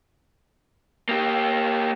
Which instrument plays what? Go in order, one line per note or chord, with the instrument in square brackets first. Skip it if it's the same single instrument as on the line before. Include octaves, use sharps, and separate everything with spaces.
[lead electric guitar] A#3 G4